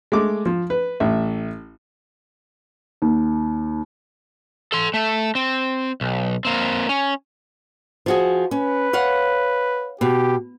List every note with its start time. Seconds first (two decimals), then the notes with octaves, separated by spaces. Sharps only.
0.12 G#3 A3 D6
0.46 F3
0.70 B4
1.00 A1 E5
3.02 D#2
4.72 A4 C6
4.94 A3
5.35 C4
6.01 B1
6.45 A#3 C4
6.89 C#4
8.06 F3 F#4 G#4
8.51 C#4 B4
8.93 C#5 F5 F#5
10.01 B2 G4